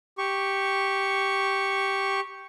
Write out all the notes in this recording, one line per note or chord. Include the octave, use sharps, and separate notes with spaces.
G4 C#6